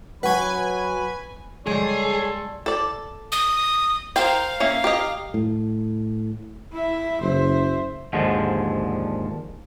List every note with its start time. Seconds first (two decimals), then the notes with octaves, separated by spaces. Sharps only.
0.23 F#3 B4 F#5 G#5 B5 C#6
1.67 G3 G#3 G#4 A4 C#5 C6
2.66 A4 D5
3.32 D#6
4.16 A#4 C5 F5 G5
4.60 A#3 C#4 E5
4.84 G4 A#4 D#5
5.34 A2
6.72 E4 E5
7.21 F#1 C5 E5
8.13 D#2 G#2 D3 F3